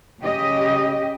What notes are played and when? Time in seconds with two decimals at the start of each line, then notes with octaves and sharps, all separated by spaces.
0.21 C#3 G4 D#5